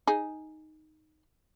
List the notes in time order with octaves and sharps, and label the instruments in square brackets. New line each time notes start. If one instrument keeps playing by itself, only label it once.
[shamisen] D#4 G#4